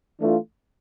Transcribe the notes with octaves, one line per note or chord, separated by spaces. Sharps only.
E3 A3 D4 F4